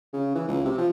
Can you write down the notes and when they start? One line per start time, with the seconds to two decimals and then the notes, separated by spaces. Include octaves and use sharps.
0.13 C#3
0.35 E3
0.48 C#2
0.65 C3
0.78 F3